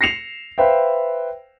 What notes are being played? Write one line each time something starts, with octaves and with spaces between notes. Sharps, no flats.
A#6 C7 C#7 E7 F7
B4 C5 E5 F5 G5